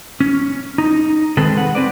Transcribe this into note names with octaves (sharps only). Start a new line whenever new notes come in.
C#4
D#4
D#3 G#3 C4 G#4 A4 B4
B4 F#5
G#3 C4 B4 D5